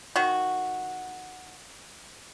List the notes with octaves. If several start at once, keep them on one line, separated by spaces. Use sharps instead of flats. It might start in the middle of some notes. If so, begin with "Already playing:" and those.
D#3 F#4